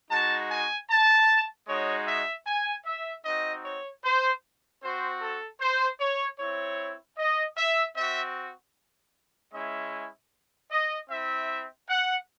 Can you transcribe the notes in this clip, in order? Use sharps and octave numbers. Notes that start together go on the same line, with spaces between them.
G#3 D#4 F#4 A5
G#5
A5
G#3 D#4 F#4 C#5
E5
G#5
E5
C4 D#4 F#4 D#5
C#5
C5
C4 F#4 C5
A4
C5
C#5
C4 E4 C#5
D#5
E5
C4 F#4 E5
G#3 C#4 E4 E5
D#5
C4 E4 E5
F#5